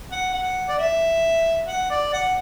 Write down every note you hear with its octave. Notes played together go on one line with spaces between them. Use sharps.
F#5
F#5
D5
E5
F#5
D5
F#5